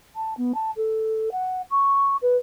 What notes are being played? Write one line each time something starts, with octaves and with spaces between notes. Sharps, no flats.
A5
B3
A5
A4
F#5
C#6
B4